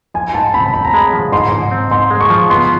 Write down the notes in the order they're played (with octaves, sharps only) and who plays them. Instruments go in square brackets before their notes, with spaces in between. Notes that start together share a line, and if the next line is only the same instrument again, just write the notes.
[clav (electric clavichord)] F3 [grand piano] G#5
[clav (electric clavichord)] G#2 [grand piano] A5
[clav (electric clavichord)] C4 [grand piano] B5
[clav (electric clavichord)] C4 [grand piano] B5
[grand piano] A#5
[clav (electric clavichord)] G#3 [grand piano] B5
[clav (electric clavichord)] F3
[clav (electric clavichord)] G#2 [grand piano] C6
[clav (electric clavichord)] G#2
C4
[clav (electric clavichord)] G#2 [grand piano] C6
[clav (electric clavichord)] G#3
[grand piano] C#6
[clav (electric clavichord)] F3
[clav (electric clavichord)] B3 [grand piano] C6